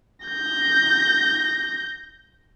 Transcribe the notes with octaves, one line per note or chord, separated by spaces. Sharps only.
G6 A#6